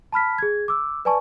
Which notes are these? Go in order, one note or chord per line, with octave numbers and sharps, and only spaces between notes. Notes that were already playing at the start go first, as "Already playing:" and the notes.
A5 B5 F6 B6
G#4 G#6
D6 E6
B4 D5 G#5 A5 C#6